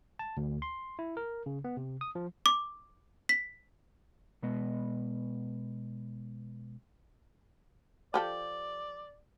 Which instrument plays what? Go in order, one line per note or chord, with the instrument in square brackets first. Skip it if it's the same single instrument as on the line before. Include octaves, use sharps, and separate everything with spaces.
[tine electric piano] A5
D2
C6
E4
A#4
C#3
B3
C3
D#6
F3
[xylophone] D6
B6
[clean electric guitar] B2 G#3 B3 B4 D#5
[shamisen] F3 G4 A4 [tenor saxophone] D5